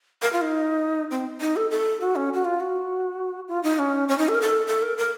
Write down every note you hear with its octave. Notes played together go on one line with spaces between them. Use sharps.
A#4
F4
D#4
C4
D#4
A4
A4
F#4
C#4
F#4
F4
F#4
F4
D#4
C#4
C#4
D#4
A4
A#4
A4
A4
A#4
A#4